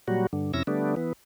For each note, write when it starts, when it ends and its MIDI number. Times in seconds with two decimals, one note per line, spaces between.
0.08 0.27 46
0.08 0.27 54
0.08 0.27 55
0.08 0.27 66
0.33 0.52 43
0.33 0.52 50
0.54 0.63 41
0.54 0.63 48
0.54 0.63 61
0.54 0.63 64
0.54 0.63 88
0.54 0.63 94
0.67 0.95 50
0.67 0.95 55
0.67 0.95 57
0.67 0.95 59
0.67 0.95 62
0.96 1.13 52
0.96 1.13 59